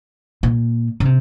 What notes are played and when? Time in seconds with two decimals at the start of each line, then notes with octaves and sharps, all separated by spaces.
0.43 A#2
1.00 C#3
1.05 C3